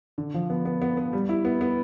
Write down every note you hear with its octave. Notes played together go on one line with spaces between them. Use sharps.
D3
F3
B3
B3
B3
B3
G3
E4
B3
B3